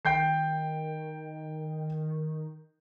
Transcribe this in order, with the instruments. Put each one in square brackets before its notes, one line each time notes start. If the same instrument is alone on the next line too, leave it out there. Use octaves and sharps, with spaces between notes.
[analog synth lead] D#3 [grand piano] G5 G6 C7